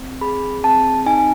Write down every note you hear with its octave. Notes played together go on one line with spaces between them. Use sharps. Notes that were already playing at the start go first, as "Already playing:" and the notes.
Already playing: C4
G#4 B5
C4 A5
D#4 G#5